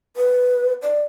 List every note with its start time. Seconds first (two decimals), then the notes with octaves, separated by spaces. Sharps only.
0.17 B4
0.82 D5